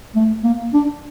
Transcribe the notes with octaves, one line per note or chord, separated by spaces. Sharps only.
A3
A#3
D4